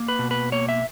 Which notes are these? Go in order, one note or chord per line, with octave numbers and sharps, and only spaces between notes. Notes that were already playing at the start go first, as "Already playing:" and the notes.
Already playing: A#3
B4
B2
B4
A#3 C#5
E5